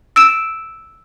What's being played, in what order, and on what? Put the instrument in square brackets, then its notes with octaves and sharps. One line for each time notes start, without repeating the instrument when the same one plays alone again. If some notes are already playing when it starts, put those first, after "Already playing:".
[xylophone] E6 D7 E7